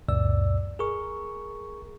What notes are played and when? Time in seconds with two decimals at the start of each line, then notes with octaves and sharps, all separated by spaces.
0.08 C#2 F#2 A#2 D5 E6
0.79 G#4 A#4 C#6